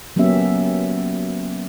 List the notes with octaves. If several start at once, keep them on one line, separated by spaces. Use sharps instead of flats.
F#3 A#3 B3 C#4 G4 E5